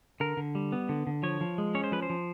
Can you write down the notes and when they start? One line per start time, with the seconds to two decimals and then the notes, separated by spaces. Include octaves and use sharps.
0.20 D3 A#4
0.37 D3
0.55 G3
0.72 B3
0.89 D3
1.07 D3
1.23 F3 C#5
1.41 F3
1.58 G#3
1.75 C#4 C#5
1.84 C5
1.92 F3 B4
2.02 C5
2.10 F3